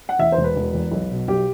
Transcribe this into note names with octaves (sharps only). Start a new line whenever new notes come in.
F#5
E2 E5
C5
E1
B4
E1
E2
B1
B2
B1 G4